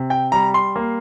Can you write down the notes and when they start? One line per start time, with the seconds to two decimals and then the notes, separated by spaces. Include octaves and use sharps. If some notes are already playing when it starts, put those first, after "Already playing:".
Already playing: C3
0.10 G5
0.32 G3 A#5
0.54 C6
0.76 A#3